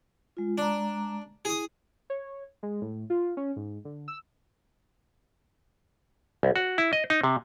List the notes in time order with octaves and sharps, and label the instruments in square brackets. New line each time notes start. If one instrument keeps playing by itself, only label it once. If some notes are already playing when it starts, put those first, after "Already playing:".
[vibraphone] G#3 F4
[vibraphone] G#3 A#5 [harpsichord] D4
[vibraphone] E4 [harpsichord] G#4 D#6
[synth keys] C#5
G#3
A2
F4
C#4
G#2
D3
E6
[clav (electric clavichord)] C2
F#4
E4
D#5
D#4
C3